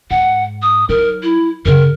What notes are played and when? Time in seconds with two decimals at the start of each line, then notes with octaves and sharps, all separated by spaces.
0.11 G#2 F#5
0.62 D#6
0.89 F#3 D#4 A#4
1.23 E4
1.66 F#2 C#3 A#4